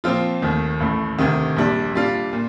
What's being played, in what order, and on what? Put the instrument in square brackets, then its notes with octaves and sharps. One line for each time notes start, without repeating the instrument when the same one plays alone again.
[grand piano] A#2 F3 C4 F4
D#2 D#3 A3
A1 A2 A3
D2 C3 D#3
A#1 A#2 G3 D4
A#2 G3 D4 F4
A#2